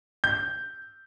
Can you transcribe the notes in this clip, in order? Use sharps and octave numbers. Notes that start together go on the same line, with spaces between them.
G6